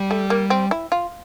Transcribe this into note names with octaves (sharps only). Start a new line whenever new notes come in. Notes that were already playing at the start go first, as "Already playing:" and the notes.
Already playing: G3
A3
A#3
C4
E4
F4